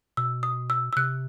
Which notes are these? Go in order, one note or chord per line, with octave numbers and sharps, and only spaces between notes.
B2 E6
D#6
E6
E6
C3 F#6